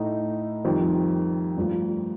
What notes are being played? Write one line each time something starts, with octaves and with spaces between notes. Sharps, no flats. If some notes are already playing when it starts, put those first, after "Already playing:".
Already playing: A2 A3 D#4
F2 D#3 G3 C4
G2 F3 A3